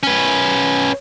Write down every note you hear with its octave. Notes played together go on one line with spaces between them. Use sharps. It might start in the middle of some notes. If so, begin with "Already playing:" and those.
C#4 B4